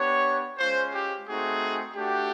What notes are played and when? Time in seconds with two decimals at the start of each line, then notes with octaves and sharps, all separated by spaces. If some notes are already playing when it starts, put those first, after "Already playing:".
Already playing: B3 D4 G4 C#5
0.59 G#3 C#4 F4 C5
0.93 G4
1.27 A3 C4 D#4 F#4 G#4
1.95 A3 D4 F#4 G4